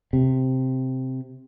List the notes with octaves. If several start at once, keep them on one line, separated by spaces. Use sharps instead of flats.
C3